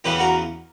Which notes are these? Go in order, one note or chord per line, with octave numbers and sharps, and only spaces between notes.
E2 C#3 E3 G4 B4
F#4 A#4